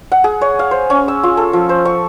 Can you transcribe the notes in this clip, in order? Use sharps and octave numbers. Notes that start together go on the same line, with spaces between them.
F#5
G#4
C#5
F5
C5
C#4
E6
F4
A4
F3
C5
C#6